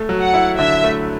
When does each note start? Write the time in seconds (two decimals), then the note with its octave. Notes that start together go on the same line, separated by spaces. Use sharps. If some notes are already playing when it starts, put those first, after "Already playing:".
Already playing: A3
0.09 F#3
0.21 F#5
0.34 E4
0.58 D3 E5
0.84 A3